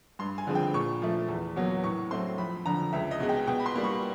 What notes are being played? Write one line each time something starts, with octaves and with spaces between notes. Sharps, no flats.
G2 C6
G#5
D3 F3 G#3 C4
G5
A#2 C#6
F3 A3
E2
B2 F#3 A#3
A2 C#6
F#3 A3 C4 C6
F2 B5
D3 F3 A#5
C#2 E5
D#5
B2 G#3
G5
B2 G5
B5
C6
G3 A#3
C#6